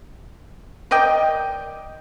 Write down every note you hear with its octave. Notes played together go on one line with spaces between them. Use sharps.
A#4 D5 D#5 G5